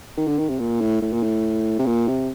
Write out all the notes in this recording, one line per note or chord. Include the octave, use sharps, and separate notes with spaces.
D#3
D3
D#3
C3
A#2
A2
A2
A#2
A2
C3
A#2
C3